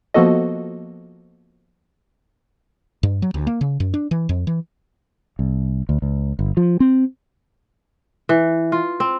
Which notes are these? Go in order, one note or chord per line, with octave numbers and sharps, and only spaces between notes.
F3 A#3 B3 F#4 A4 D#5
G2
F#3
D2
A#3
C#3
F#2
D4
E3
F2
E3
C2
D2
C#2
G1
F3
C4
E3
F4
C4